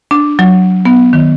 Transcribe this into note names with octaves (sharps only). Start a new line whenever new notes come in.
D4
F#3
B3
D#3